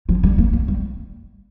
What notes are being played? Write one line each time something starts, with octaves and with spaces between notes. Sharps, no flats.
F3
G3
A#3
A#3
G3